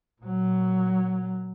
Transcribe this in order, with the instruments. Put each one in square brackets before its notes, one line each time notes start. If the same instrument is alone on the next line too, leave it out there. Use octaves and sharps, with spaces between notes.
[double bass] A#2 F#3